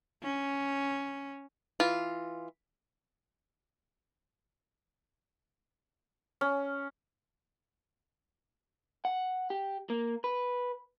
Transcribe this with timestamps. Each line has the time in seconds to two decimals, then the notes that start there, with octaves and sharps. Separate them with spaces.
0.23 C#4
1.80 E3 F4
6.41 C#4
9.05 F#5
9.50 G4
9.90 A#3
10.24 B4